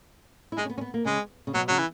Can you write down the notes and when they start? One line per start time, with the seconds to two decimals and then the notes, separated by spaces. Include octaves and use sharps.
0.52 E4
0.57 G#3 D#4
0.65 C#4
0.70 B3
0.78 C#4
0.81 B3
0.94 A#3
1.05 C#3 G#3
1.47 C#3
1.54 B2 F#3
1.68 C#3 F#3
1.78 E3